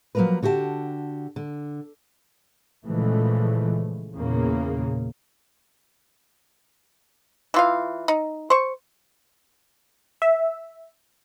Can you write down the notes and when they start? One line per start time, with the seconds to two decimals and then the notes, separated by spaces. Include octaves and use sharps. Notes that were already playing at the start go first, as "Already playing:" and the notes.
0.15 F3 F#3 A3 A#3 A#4 B4
0.43 D3 F#4 G4 E5 A5
1.36 D3
2.86 A#2 C#3 E3 F3 G#3 A3
4.16 E2 A#2 C#3 A#3
7.54 E3 F4 F5
8.08 D#4
8.50 C5 C#6
10.22 E5